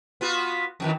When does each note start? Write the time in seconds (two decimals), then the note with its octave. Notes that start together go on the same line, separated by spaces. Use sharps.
0.21 B3 F4 F#4
0.80 F2 D#3 E3